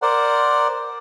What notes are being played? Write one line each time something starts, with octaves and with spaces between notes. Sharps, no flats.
A#4 C5 D5 F#5